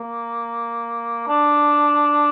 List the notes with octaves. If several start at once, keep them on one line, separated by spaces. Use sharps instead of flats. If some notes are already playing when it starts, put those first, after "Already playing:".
Already playing: A#3
D4